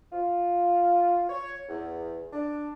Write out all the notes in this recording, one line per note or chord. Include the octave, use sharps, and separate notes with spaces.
F4
C#5
E2
D4